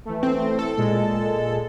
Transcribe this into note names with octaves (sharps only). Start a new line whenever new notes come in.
E3 A3
C4
A4
A#2 G#3